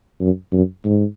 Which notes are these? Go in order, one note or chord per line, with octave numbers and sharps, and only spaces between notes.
F#2
F#2
G#2